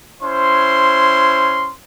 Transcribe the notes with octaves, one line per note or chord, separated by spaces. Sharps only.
C#4 E4 C5 C6